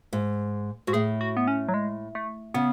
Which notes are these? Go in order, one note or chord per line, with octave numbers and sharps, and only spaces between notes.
G#2
G#2 F#4
A2 G#4
F#4
B3
C#4
F#3
G#3
A3
C#3 B3